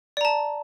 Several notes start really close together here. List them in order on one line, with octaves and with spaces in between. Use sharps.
D5 A#5 A5